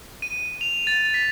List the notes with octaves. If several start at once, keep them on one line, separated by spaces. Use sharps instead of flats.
D#7
F7
A6
B6